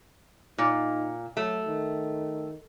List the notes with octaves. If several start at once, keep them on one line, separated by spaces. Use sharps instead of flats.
A#2 D#4
F#3 A3
D#3